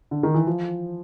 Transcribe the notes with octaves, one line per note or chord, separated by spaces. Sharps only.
D3
D#3
E3
F3